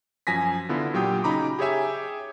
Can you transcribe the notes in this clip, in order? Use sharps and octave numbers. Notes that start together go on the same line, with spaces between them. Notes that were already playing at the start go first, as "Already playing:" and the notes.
F#2 F3 G#5 A#6 B6
D3 B3 E4 F4
A#2 F#3 G4 G5 D#6
C#3 D#4 A#5 B5 D6
G4 G#4 C#5 E5 G#5